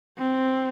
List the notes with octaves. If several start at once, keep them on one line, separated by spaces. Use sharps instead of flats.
C4